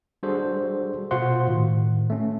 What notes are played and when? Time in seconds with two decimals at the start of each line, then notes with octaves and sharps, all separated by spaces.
0.23 G3 D4 F#4 G#4 A4 C5
1.11 B2 F4 F#4 C5 F#5 C6
1.47 A2 D#3
2.10 A3 C#4